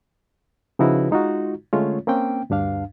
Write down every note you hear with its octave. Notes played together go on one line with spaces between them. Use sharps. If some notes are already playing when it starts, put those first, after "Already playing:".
C#3 F3 D#4 E4 F#4 B4
G#3 D#4 F4 F#4
D3 G#3 A3 C#4 F4 C#5
A#3 C4 C#4 G5
D2 G2 D4 F5